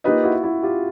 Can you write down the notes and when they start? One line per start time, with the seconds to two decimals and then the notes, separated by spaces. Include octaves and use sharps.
0.04 A#3 D#4 F4 G4 B4 D#5
0.24 E4 F#4
0.43 E4 F#4
0.62 F4 G4